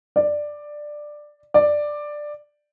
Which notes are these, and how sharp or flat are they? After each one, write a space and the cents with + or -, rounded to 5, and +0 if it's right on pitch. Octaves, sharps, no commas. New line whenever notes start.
D5 +10
D5 +10